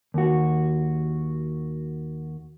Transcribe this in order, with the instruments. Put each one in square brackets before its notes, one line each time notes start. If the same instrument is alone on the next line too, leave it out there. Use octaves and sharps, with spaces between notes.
[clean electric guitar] D#2 F#4